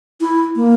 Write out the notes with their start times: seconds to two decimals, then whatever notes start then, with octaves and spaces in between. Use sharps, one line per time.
0.21 E4
0.56 A#3